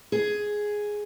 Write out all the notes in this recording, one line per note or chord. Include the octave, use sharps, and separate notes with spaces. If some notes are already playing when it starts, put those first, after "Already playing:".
G#4